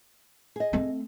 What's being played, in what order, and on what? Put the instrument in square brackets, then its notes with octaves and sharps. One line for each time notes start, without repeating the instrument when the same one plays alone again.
[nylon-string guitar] G#4 D#5
[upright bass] A3 C4